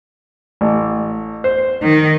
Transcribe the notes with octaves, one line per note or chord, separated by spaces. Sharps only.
A1
C5
D#3